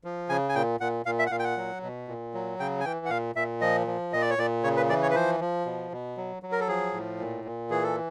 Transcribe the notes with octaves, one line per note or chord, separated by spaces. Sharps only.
F3
C#3 G#5
G#5
A#2 G5
A#2 F#5
A#2 F5
E5
F#5
A#2 F5
G5
F#5
F#3
B2
A#2
F#3
C#3 G5
G#5
E3 G5
F#5
A#2 F5
A#2 E5
F3 D#5
F3
A#2 D#5
D5
C#5
A#2 D5
C#3 C#5
B4
E3 D5
C#5
B4
F3 C5
F3
B2
B2
F#3
F#3
A#4
A4
F3 G#4
A2
A#2
A#2
E3 G#4
A4